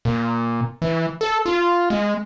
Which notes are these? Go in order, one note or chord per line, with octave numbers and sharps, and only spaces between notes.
A#2
E3
A4
F4
G#3